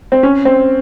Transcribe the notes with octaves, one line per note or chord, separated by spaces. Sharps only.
C4
C#4
C4